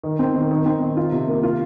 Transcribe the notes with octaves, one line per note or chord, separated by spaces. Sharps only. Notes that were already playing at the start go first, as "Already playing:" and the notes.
D#3
C4
D#3
D#3
C4
D#3
F4
C3
A#3
F4